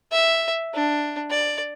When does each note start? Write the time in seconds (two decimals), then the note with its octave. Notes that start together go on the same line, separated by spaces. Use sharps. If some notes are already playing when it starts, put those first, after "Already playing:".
0.12 E5
0.74 D4
1.30 D5